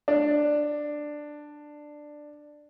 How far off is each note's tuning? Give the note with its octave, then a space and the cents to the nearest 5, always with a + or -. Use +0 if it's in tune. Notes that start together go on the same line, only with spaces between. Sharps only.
D4 +10